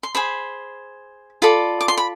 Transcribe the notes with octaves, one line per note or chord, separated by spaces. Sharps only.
C6
G#4 C5 B5
F4 A4 D5 B5
D6
C6
B5